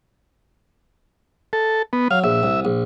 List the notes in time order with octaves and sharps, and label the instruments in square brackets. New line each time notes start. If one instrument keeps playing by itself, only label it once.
[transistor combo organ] A4
B3
[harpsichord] F#3 [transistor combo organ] F5
[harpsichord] A#1 [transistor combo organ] E5
[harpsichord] C2
A#1